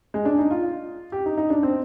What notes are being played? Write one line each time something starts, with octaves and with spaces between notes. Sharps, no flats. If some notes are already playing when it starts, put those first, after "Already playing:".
G#3
D4
D#4
F4
G4
D#4
D#4
D4
C4